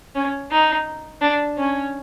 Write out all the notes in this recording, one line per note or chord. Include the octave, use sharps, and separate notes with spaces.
C#4
D#4
D4
C#4